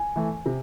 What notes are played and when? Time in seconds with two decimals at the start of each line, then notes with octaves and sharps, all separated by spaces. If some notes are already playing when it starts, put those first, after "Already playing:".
Already playing: G#5
0.16 E3 A3
0.46 C3